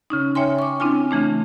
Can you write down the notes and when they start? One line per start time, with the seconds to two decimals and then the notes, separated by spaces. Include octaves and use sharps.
0.10 C#3 C#4 D#4
0.35 C#5 E5 G5 G#5 C6
0.59 C#6 D6
0.80 C4 D4 E4 F4 G#5
1.11 C#3 E3 A3 D4